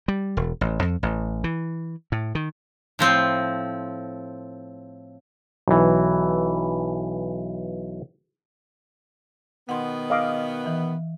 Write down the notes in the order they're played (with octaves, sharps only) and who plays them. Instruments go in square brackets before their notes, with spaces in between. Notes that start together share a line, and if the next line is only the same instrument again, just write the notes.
[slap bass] G3
E1
A1
F2
A1
E3
A2
D#3
[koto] A2 F3 C4
[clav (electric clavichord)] B1 E3
[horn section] B2 D#3 B3 [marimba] F#5 C6
[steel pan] D#5 F5 D6
[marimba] E3